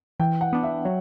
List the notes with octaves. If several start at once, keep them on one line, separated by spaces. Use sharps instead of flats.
E3 G5
F#5
B3 D4
E5
F#3 C#5